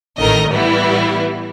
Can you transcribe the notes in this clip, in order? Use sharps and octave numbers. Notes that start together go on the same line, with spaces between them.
A1 D#3 A3 A#4 D#5
A2 E3 G3 B3 E4